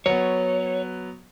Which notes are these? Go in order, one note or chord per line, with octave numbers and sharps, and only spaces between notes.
F#3 B3 C#5